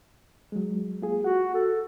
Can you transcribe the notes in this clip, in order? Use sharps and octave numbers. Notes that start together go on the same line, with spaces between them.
F#3 G#3
A#3 F4 G#4
F#4 F#5
A4